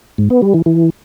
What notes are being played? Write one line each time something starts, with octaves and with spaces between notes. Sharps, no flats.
G#2
B3
G3
E3
E3